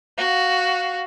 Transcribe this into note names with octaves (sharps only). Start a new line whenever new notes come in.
F#4 F5